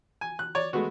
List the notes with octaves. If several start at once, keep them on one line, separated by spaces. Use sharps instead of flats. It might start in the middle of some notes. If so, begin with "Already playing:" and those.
G#5
F#6
C#5 D5
G#3 A3 B3 F#4